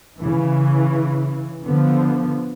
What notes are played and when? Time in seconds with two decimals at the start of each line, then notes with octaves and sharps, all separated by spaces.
0.18 C#3 E3
1.63 D3 F3 B3